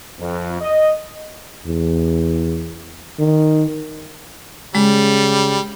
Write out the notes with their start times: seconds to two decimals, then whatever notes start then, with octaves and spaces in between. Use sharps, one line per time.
0.20 F2
0.61 D#5
1.66 E2
3.19 D#3
4.75 C#3 G3 G#3